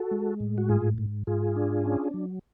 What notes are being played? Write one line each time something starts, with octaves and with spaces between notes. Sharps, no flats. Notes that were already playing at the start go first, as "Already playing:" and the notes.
Already playing: F#4 A4
G#3
A2
F#4
G#2 F4 G#4
G#2
G#2 F4 G#4
D4
C#4
F#3